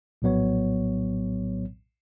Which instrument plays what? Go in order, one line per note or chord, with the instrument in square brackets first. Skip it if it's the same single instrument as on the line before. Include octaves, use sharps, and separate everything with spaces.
[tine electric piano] A#1 A2 F#3 B3 C#5